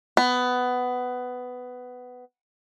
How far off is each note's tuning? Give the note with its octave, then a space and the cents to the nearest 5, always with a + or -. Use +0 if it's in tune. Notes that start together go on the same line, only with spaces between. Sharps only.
B3 +15